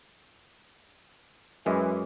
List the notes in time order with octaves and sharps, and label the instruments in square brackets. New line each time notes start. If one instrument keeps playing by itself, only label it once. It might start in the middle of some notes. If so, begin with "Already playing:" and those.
[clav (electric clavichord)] F#2 G#3 [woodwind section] E3